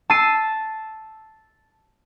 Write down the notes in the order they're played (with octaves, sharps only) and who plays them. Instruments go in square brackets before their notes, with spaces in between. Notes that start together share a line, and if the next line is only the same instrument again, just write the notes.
[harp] A5 E6 C7 D#7